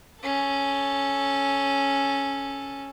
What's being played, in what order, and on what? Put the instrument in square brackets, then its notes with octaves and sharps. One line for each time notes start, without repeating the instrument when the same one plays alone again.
[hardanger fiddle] C#4 A4